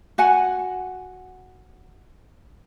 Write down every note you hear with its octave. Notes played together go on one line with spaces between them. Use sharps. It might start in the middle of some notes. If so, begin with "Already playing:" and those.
F#4 F#5 G#5